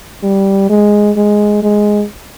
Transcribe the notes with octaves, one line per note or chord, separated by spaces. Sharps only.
G3
G#3
G#3
G#3